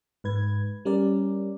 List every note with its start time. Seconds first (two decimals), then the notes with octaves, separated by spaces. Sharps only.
0.24 G#2 B4 G#6
0.85 G3 C#4 A#4 D5